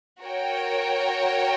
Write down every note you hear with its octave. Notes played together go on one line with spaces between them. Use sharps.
F#4 A#4 C#5 G5